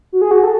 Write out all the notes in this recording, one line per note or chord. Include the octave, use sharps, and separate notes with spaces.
F#4
G#4
F#4
A4